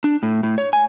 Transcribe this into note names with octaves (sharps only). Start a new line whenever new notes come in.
D4
A2
A2
C#5
G#5